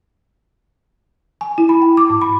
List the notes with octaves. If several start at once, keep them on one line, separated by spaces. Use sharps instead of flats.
G#5
E4
B5
G5
D6
G#2
B5